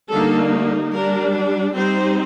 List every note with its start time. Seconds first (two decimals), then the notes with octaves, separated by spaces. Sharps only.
0.10 D3 G3 A#3 D#4 A4
0.91 G3 D4 A#4
1.73 G3 C4 D#4 C5